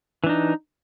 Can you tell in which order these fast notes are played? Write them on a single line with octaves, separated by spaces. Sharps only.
E3 D4 D#4